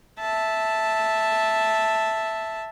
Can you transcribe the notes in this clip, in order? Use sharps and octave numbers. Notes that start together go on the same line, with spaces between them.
E5 A5